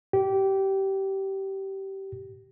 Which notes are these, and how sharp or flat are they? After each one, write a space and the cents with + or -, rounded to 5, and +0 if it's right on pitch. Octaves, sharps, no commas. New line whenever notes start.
G4 -20